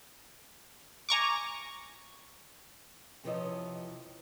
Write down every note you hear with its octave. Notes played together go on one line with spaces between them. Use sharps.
G#5 A#5 C#6 D6
F2 C3 E3 F3 C#5 D#5